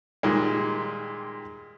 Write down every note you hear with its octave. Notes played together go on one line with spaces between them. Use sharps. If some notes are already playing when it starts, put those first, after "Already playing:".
A#2 D#3 G3 G#3